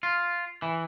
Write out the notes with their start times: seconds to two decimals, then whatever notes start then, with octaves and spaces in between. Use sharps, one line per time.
0.03 F4
0.62 E3